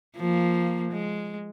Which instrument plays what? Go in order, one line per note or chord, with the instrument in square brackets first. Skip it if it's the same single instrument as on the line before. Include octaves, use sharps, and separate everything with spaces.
[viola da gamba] F3 A#3
G#3